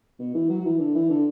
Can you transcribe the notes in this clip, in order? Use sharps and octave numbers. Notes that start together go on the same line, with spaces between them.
B2
E3
F#3
F#3
E3
D3
E3
D3